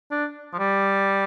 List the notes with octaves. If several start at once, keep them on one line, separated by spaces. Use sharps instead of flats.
D4
F3
G3